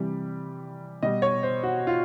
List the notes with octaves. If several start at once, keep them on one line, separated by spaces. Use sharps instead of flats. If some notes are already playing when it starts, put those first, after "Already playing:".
Already playing: C3 E3 G3
B2 G3 D#5
C#5
C5
F#4
F4